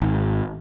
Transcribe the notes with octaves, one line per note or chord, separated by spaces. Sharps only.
G#1